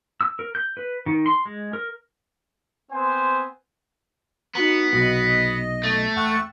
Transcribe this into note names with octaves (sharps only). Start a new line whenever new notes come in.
E6
A#4
G6
B4
D#3
C6
G#3
A#4
B3 C4 C5 G#5
B3 D#4 F#4 A#5
B1 C3 F#3 D#5
A3
E2 F#5 G5 C#6 E6 F#6